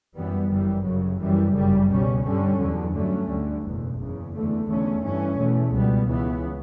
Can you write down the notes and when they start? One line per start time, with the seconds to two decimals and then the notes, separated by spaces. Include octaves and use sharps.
0.15 F#2 E3 G3 B3
0.50 G1 F#2 E3 G3
0.85 F#2 C#3 F#3
1.20 F#2 E3 G3
1.54 G1 F#2 C#3 G3
1.89 C#2 B2 G3 C#4
2.24 G2 D3 G3 C#4
2.59 E2 D3 F#3
2.94 G2 D3 F#3 A3 C#4
3.28 D2 D3 G3
3.64 F#1 E2 B2
3.99 F#1 E2 C#3
4.33 E2 D3 A3
4.68 E2 D3 A3 C#4
5.03 G2 E3 A3 C#4
5.38 E2 B2 A3
5.73 C#2 B2 G3 B3
6.08 C#2 C#3 E3 B3